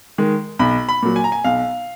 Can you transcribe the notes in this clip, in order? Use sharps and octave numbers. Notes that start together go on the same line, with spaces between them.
D#3 G#3
B1 B5
B5
A#2 F#3
G#5
A#5
G#5
B1 F5